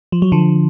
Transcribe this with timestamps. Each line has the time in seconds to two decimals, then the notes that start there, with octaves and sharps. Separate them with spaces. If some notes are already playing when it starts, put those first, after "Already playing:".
0.12 F3
0.22 F#3
0.32 D3 F3